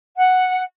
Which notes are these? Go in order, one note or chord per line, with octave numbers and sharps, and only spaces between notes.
F#5